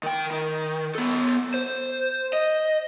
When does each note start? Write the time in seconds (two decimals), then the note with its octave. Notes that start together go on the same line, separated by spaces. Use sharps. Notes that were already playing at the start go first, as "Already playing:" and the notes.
0.03 D#3 G5
0.31 D#3
0.95 B3 A4
1.54 C5
2.33 D#5